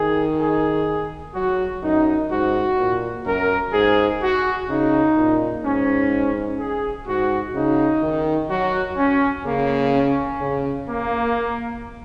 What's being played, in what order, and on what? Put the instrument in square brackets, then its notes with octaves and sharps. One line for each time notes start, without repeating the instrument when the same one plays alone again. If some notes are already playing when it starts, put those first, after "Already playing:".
Already playing: [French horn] D#3 [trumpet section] G#4
[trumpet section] G#4
[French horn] F#3 [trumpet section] F#4
[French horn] F#2 [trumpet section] D#4
[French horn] G#2 [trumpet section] F#4
[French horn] A#2
[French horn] F#2 [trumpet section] A#4
[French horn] G#2 [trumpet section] G#4
[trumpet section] F#4
[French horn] C#3 [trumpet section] D#4
[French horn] A#2
[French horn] G#2 [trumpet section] C#4
[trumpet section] G#4
[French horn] G#2 [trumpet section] F#4
[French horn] C#3 [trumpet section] D#4
[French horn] D#3
[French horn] F#3 [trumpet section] F#4
[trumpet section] C#4
[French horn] C#3 [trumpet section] A#3
[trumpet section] C#4
[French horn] C#3
[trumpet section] A#3